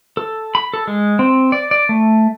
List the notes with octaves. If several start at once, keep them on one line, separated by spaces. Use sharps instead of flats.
A4
B5
A4
G#3
C4
D5
D5
A3